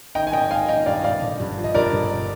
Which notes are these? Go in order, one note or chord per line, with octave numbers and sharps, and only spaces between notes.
D#3 D#5 G5
G#5
G#1 D#5 G5
G#1 F5 G#5
D#3 D#5 G5
G2 D5 F5
G#1 D5 F5
G1
G2
F3
D#5
G2 A#4 D5
G1